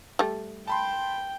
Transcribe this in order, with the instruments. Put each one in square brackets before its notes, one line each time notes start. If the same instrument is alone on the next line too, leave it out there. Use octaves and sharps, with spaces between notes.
[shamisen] G3 A3
[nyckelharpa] G5 [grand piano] A5 B5 C6